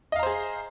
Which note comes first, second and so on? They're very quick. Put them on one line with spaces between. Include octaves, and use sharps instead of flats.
D#5 F5 A#5 C5 G#4